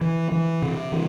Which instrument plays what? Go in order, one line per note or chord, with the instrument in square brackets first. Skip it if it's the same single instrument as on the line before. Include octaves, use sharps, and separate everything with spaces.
[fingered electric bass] E3
E3
C3
E3